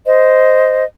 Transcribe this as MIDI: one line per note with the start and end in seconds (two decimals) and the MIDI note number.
0.05 0.84 72
0.05 0.84 75